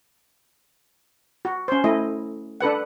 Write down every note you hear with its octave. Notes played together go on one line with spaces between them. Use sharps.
F#4
C#4 C5
A3 E4 D#5
D4 A4 B4 F#5